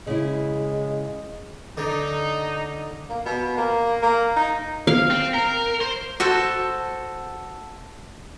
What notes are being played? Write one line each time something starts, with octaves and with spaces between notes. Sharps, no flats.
C#3 G#3 E4
D3 D#4
A#3
B2
A#3
A#3
D#4
F5
C4
A#4
C5
F#4 A4 C5